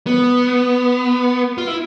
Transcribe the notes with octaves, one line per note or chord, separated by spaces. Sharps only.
B3
F4
E4